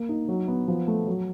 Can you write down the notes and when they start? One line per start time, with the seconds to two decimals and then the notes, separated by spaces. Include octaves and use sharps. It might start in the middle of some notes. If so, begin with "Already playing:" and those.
Already playing: A#3
0.09 D#4
0.28 F#3
0.48 B3
0.68 F3
0.88 A3
1.07 F#3